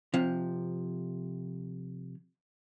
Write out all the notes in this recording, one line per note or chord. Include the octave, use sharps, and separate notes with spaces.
C3 F3